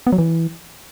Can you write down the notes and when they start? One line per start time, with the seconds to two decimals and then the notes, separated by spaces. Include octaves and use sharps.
0.07 B3
0.12 F#3
0.18 E3